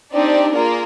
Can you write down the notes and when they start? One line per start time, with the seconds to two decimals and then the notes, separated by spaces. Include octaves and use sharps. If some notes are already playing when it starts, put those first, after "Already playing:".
0.13 C4 D4 D#4 G4 D5
0.55 A#3 F4 G#4 A#4